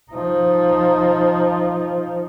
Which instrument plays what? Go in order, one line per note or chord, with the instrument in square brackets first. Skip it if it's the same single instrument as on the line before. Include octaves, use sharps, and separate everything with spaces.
[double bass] F3 D#4